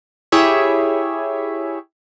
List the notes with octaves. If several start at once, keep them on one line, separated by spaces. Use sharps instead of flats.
E4 G4 G#4 C#5 E5